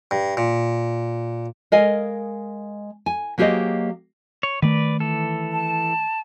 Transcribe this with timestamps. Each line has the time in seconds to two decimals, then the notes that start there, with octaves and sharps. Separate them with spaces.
0.11 G2
0.37 A#2
1.72 G#3 A#4 D#5 F5 G#5
3.06 G#5
3.38 F#3 A#3 G4 G#4 C5 D#5
4.43 C#5
4.62 D#3 A3 B4 D5
5.00 E3 A4
5.53 A5